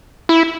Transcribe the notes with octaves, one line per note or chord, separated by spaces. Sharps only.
E4